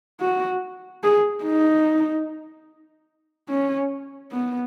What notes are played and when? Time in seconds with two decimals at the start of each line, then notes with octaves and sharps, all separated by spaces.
0.21 F#4
1.03 G#4
1.45 D#4
3.50 C#4
4.32 B3